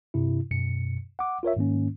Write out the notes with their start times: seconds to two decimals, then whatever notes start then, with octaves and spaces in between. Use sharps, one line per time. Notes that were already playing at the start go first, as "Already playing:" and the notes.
0.14 G2 C3 E4
0.51 F#2 B2 C#7
1.19 F#5 D6
1.43 F4 A#4 C#5 E5
1.56 G#2 D#3 A#3 C#4